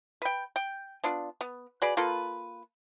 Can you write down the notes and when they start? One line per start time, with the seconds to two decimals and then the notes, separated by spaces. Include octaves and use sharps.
0.22 B4 G5
0.56 G5
1.04 B3 D4 F4
1.41 B3
1.82 F#4 G#4 B4 D5
1.97 A#3 F4 A4 B4